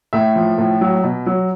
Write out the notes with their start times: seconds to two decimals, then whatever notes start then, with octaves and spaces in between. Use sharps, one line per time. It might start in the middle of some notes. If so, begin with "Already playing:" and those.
0.13 A2 E5
0.35 F3
0.58 A2
0.81 F#3
1.04 B2
1.26 F#3